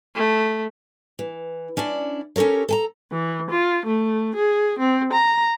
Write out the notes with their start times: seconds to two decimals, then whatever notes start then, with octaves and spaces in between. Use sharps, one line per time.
0.15 A3
1.19 E3
1.77 C#4 D4 E4 D5
2.36 C#4 G4 A4 A#4 C#5
2.69 A4 G#5 A#5
3.11 E3
3.49 F4
3.86 A3
4.33 G#4
4.78 C4
5.11 A#5